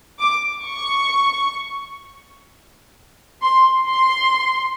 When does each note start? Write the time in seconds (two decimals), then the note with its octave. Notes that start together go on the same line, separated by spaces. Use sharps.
0.19 D6
0.65 C#6
3.42 C6
3.87 C6